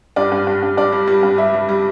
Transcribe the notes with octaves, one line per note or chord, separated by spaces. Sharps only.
G2 D5
G2
G2
G2
G2 D5
G3
G3
G2
G3 E5
G3
G3